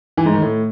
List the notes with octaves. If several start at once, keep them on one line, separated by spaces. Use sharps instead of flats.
E3
G#2
D#3
A2